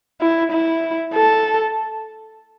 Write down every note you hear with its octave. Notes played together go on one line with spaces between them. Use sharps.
E4
E4
A4